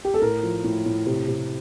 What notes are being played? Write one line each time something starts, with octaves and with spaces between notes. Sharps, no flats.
G4
A4
A2 A#4
F3
A2
A2
C3
C3